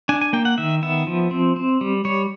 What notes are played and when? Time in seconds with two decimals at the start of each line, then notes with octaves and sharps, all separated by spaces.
0.09 D4 G#5
0.21 G#5
0.33 A#3 G5
0.45 F#5
0.58 D#3 E5
0.83 B3 E5
1.07 F3
1.31 C4
1.56 C4
1.81 G3
2.05 G3 C#5